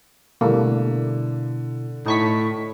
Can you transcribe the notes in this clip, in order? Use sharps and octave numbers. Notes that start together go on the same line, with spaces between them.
B2 D3 G3 A3 A#3 E4
A2 D#4 C#6 B6